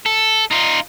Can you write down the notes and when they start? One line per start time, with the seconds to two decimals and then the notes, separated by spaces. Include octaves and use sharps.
0.06 A4
0.51 D#4 F4